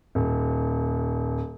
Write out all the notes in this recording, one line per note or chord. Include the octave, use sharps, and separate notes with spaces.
D#1